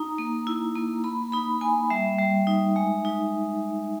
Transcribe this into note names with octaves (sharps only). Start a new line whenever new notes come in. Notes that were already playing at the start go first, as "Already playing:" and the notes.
Already playing: D#4 A#5
A#3
E4
A#3
A#3 B5
D#4 B5
A#3 G#5
G3 E5
G3
D#4
G#3
D#4